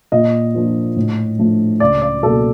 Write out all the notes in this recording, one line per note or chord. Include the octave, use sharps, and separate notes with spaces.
A#2 D#5
F3 A#3 D4
A2
F3 A3 D4
C#2 D5
D5
B2 F#3 A#3 A4